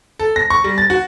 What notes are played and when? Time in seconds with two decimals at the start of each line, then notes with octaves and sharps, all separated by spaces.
0.19 A4
0.36 A#6
0.50 C#6
0.64 G3
0.78 A6
0.90 F#4